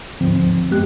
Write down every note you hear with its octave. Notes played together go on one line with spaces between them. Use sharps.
D2 G#2 D3 F3 C4
F#2 G#3 B3 G4 F#6